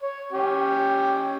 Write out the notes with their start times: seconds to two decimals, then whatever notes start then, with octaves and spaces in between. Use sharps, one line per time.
0.02 C#5
0.32 C#4 G4